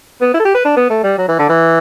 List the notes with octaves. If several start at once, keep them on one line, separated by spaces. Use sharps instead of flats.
B3
E4
A4
G4
B4
D4
B3
A3
G3
F#3
E3
D3
E3